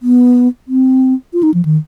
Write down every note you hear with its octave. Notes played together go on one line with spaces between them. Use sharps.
B3
C4
F4
D#4
F3
D#3